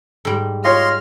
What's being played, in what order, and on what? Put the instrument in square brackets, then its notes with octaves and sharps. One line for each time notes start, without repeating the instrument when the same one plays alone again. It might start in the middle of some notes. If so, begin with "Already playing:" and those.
[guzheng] G#2 G3
[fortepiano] F4 C#5 [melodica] D#5 C6 [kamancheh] F6